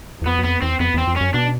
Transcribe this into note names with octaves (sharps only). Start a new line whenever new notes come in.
E2
F2 B3
F#2
F2 B3
E2 C4
F2 B3
E2 C4
F2
F#2 C#4
B2 D4